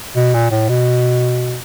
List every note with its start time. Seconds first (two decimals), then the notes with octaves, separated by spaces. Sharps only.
0.16 B2
0.34 A#2
0.51 A2
0.69 B2